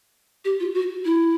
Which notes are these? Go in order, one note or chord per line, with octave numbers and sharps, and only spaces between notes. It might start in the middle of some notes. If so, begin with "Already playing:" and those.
G4
F4
F#4
E4